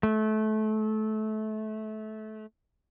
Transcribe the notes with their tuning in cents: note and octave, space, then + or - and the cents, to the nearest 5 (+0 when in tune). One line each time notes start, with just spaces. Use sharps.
A3 -25